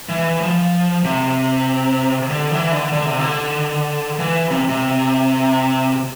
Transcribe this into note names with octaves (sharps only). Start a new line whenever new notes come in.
E3
F3
C3
D3
E3
D3
D3
C3
D3
E3
C3
C3